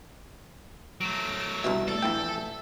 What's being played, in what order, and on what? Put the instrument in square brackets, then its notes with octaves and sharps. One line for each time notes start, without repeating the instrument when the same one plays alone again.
[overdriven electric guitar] F#3 A3 [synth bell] D7
[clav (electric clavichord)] C2 G2 B2 [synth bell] E5
[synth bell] A3 D5 [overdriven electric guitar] A4
[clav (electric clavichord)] A#1 E3 G5 [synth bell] E5